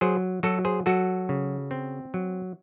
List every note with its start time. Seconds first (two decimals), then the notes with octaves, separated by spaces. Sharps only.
0.01 F#3 G#4 C5
0.43 F#3 F#4 A4
0.65 G#4 C5
0.86 F#3 F#4 A4
1.29 C#3
1.71 C4
2.14 F#3